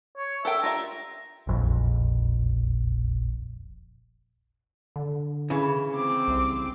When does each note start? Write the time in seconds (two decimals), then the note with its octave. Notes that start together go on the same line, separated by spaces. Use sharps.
0.18 C#5
0.45 A4 A#4 E5 G5
0.63 F4 G4 E5 A#5
1.47 E1 A#1 F2
4.96 D3
5.50 C#3 E3
5.95 C4 D6
6.28 C2